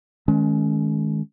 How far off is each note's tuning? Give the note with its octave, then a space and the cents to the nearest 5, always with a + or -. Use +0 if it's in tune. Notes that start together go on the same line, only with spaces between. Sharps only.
D#3 +5 G#3 +25 C#4 +5